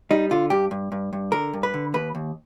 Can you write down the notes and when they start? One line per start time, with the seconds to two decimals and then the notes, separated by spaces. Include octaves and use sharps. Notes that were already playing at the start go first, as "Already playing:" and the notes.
0.11 G3 D#4
0.31 D3 F4
0.50 G2 G4
0.71 G2
0.92 G2
1.13 G2
1.32 D3 A#4
1.53 G2
1.63 B4
1.74 D3
1.94 D#2 B4
2.15 D#2